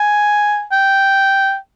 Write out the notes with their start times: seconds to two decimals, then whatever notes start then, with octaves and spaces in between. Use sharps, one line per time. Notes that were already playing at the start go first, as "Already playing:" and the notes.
Already playing: G#5
0.72 G5